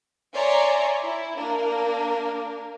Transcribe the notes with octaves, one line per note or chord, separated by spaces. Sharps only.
C#5 D5 E5 G#5 A#5 C6
E4
A#3 D4 A#4